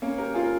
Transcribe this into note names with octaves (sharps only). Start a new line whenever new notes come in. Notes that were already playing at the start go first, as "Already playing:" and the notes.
A#3 C#4
G4 A#4
F4 G#4
A#4